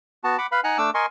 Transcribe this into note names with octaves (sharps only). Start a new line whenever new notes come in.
B3 F#4 A5
F#5 B5 D6
B4 F5 B5
D#4 F#5 G#5 A#5 F#6
A3 D4 D6 E6
A#4 D#5 G#5 C6 C#6